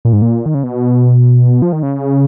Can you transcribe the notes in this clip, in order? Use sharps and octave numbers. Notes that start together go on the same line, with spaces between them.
A#2
G#2
A#2
D#3
C#3
B2
F3
D#3
C#3